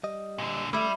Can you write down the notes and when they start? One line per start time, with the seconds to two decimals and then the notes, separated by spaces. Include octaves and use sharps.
0.04 G3 D#5
0.38 A#2 D3
0.73 G3 A3 E4 E5